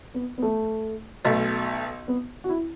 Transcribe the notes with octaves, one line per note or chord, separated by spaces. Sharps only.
B3
B3
A3
B1 B2 A3
B3
F#4
E4